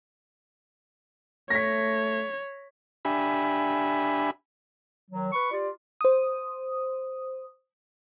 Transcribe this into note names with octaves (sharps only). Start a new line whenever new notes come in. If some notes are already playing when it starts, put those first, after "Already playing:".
A3 C#5 A#6 B6
D4 G4 E5 G#5 B5
D#3 F#3
B4 B5 C#6
F4 G4 D5
C5 D#6